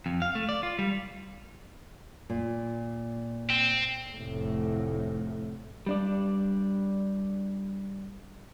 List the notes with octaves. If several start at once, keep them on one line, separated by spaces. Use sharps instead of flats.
F2
F5
A3
D5
F4
G3
A#2
C4
F1 A2
G3 D4 D5